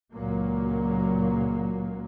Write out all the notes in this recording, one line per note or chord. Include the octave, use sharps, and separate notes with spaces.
C#2 A#2 F#3 A#3